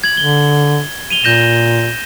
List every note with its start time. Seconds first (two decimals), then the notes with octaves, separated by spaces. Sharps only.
0.04 G#6 F#7
0.17 D3 G7
1.10 D#7 F7 G7
1.24 A#2 G6 A#6 E7